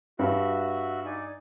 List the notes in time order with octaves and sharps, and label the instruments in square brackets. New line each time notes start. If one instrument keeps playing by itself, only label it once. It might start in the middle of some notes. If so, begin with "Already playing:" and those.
[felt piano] G2 [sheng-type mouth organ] F#4 E5 F#6
[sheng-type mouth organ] D#4 D5 G#5